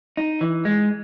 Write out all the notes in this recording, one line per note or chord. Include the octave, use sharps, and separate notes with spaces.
D#4
E3
G#3